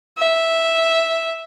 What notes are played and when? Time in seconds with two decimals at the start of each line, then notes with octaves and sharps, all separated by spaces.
0.18 E5